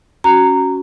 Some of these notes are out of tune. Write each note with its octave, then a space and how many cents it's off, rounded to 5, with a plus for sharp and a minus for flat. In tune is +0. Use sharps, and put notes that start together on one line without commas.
C#4 +0 F#4 +0 A#5 -15